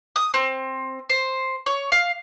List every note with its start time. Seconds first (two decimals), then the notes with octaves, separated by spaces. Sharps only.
0.16 D#6
0.34 C4
1.10 C5
1.66 C#5
1.92 F5